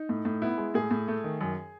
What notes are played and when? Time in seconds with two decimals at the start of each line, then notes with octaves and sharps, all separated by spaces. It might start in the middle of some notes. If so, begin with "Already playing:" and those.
Already playing: D#4
0.09 A2
0.25 A2
0.42 B3 E4
0.58 G#3
0.74 A2 G#4
0.91 A2
1.08 A3
1.24 D#3
1.41 F#2